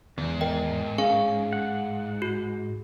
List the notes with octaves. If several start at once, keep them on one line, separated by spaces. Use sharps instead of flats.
E2 G#2 D#3
A#4 D#5 G5
C#4 G#4 F5
F#5
F#4